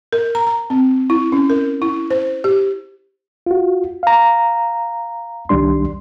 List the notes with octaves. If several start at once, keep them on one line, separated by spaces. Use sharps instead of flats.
A#4
A#5
A#5
C4
E4
C#4
A#4
E4
C5
G4
F4 F#4
F5 A#5
C2 D#3 G3 D4 C6